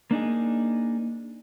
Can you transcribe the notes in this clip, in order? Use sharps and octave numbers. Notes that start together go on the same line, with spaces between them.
A#3 D4 D#4 G#4